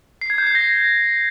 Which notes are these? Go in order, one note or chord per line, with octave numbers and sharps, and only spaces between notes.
C7
G#6
G6
C7
A#6